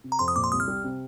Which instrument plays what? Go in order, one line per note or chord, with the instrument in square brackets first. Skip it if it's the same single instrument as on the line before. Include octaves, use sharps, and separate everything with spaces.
[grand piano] C3
[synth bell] A#5
[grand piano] F2 [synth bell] C6
[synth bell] D#6
[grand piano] A#2 [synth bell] D6
[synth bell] C6
[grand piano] C2 [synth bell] D#6
[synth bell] F6
[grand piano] G3
C3